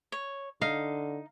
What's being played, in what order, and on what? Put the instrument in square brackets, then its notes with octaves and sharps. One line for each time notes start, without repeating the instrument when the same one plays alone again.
[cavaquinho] C#5
[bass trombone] D3 [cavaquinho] D#4 [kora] F5